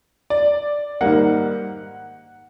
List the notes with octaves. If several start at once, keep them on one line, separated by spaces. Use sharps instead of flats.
D5
G#2 D#3 G3 A#3 F#5